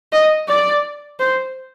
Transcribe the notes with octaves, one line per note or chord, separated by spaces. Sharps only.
D#5
D5
C5